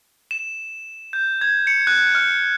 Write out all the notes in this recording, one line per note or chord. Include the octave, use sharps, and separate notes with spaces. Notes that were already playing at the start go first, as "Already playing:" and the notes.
E7
G6
G#6
C#7
F#6
F6